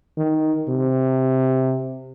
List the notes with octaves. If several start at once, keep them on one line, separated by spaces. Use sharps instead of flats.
D#3
C3